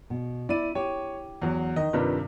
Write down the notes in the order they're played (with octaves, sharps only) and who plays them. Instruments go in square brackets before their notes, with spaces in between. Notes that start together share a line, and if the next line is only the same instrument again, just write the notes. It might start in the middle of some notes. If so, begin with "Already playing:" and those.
[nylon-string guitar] B2
[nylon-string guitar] E4 [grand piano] D5 D#7
[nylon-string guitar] G4 [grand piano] C#5
[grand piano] E2 F#3
[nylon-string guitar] D#3 [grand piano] D#5
[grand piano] G2 C3 D#3 [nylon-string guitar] D4 F4 B4